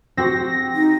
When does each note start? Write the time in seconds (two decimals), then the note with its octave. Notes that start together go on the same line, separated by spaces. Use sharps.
0.17 C4 F#4 G4 A#6
0.75 D#4